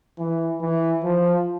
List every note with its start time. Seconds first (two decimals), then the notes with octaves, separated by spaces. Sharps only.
0.19 E3
0.62 E3
1.04 F3